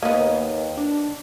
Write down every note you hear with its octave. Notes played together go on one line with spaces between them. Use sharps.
D#2 A#3 B3 D#5
D4